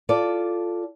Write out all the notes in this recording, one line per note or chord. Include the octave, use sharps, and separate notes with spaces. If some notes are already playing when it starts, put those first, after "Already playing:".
F4 A4 D5